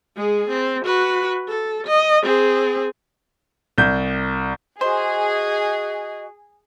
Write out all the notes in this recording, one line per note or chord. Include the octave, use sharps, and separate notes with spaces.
G#3 G#4
C4
F#4 B4
A4
D#5
C4 G#4
C2 G6
F#4 G#4 C5 D#5